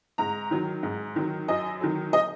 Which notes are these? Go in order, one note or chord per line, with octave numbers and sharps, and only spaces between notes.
G#2 A#5
D#3 F#3
G#2
D#3 F#3
F#2 D#5
D#3 F#3
D#5